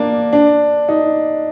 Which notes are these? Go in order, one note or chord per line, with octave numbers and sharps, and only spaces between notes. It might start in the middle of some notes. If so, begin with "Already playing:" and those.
Already playing: A#3 D4
D4
D#4